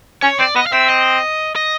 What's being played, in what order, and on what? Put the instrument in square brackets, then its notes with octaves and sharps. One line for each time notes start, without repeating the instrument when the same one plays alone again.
[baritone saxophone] C#4 [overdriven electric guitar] C#5
[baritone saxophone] C4 [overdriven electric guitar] D5
[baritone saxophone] B3 [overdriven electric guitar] D#5
[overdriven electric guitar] F5
[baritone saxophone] C4 [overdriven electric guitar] E5
[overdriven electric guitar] D#5
D#5